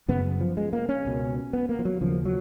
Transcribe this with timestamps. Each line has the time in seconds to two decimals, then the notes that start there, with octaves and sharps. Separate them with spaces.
0.08 F#2 C#3 B3
0.41 F3
0.57 G#3
0.73 A#3
0.89 C#4
1.05 C#2 B2
1.53 B3
1.69 A#3
1.79 F3
1.85 F#3
2.01 D#2 C#3 F3
2.25 F#3